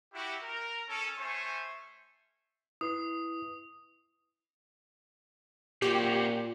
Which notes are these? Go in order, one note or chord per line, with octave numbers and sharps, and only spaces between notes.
E4 F#4 G4
A#4
C#4 A4
A3 C#4 C5 E5 G#5 C#6
E4 B4 D#6 C7
A#2 C4 C#4 F#4 G4